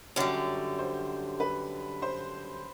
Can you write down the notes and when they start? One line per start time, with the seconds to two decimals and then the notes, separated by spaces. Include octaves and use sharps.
0.16 F#2 D3 G3 C#5
0.79 C5
1.40 B4
2.02 C5